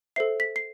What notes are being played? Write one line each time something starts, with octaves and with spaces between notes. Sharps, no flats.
A4 C5 E5 C7
B6
C7